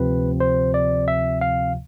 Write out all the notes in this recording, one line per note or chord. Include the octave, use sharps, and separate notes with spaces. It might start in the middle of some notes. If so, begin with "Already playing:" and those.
Already playing: D2 C3 F3 C4 B4
C5
D5
E5
F5